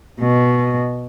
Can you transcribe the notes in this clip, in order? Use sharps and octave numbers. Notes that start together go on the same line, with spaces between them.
B2